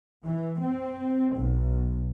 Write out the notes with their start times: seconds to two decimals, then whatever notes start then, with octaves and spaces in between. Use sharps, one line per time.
0.24 E3
0.60 C4
1.36 B1